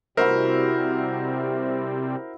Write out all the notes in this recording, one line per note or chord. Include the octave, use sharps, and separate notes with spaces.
C3 G3 C4 E4 F#4 A#4 C5 E5